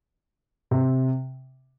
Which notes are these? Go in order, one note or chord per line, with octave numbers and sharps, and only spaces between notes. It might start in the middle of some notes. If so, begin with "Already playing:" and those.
C3